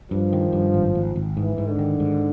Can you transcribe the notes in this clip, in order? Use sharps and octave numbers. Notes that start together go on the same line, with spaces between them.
G2 F3
D#3
G2
G#1
G#1
G#1
G#2 E3
G#2
D3
D#3
G#2